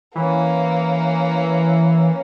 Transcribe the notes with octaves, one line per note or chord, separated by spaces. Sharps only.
E3 A#3 C#4